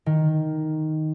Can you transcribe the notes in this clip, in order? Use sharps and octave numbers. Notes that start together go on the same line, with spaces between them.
D#3